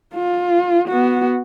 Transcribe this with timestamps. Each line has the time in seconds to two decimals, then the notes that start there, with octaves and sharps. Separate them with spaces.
0.15 F4
0.88 B3 F#4